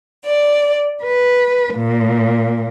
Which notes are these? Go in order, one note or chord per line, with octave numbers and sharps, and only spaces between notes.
D5
B4
A#2